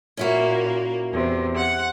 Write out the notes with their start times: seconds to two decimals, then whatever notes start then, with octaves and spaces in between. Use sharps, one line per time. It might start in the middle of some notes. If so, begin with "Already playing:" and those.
0.17 A#2 A#3 C#4 E4 F#4
1.12 E2 C3
1.56 F#5